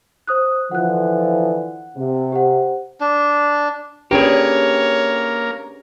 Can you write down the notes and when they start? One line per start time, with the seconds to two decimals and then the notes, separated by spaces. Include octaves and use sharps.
0.27 C5 D#6 F#6
0.71 D3 E3 F3 F#5 F#6
1.97 C3
2.32 G4 C5 F#5
3.01 D4
4.11 A#3 C#4 D4 G4 G#4 A#4 B4 C#5